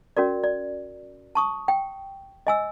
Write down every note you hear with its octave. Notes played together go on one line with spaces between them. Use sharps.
C#4 F#4 A#4 D5
D5
A5 C#6 D#6
G5
D#5 G#5 E6